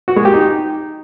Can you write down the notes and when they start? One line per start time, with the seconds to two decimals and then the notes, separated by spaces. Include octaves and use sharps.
0.08 F#4
0.16 G#3
0.25 G4
0.34 D#4